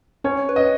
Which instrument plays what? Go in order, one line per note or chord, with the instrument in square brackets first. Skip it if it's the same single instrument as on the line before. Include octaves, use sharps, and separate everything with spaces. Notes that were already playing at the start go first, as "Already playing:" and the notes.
[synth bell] C#4 [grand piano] C#5
[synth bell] B4
[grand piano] D#5